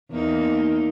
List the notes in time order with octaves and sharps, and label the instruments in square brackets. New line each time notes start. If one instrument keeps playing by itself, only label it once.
[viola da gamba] E2 A#3 D#4